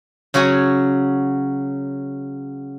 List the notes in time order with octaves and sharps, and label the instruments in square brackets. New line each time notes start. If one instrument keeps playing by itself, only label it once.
[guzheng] C#3 F#3 F#4 C#5 G#5